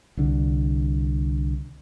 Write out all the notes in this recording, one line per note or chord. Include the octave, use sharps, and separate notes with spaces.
C2 D3